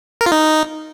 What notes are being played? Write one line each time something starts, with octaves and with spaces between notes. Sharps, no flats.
A#4
F4
D#4